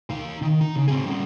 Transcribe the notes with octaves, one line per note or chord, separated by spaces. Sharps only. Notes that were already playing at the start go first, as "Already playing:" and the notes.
D#4 F5
D#3
D#4
C#3
C4 G#4
G3 C#4